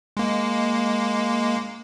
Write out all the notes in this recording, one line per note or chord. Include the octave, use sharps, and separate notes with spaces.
G#3 A#3